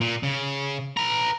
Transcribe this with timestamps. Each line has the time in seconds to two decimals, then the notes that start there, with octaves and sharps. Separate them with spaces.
0.01 A#2
0.23 C#3
0.97 B4 A#5